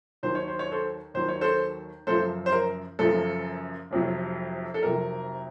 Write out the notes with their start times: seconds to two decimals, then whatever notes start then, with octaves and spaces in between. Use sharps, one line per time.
0.23 D#2 D#3 F#3 C5
0.35 C#5
0.48 C5
0.59 C#5
0.72 A4 C5
1.14 D#2 D#3 F#3 C5
1.29 C#5
1.41 A4 C5
2.07 F#1 F#2 F3 A4 C5
2.46 C5
2.52 A#4
2.99 F#1 F#2 F3 A4
3.91 F1 F2 C3 F#3
4.74 A4
4.83 F1 F2 C3 F#3 A#4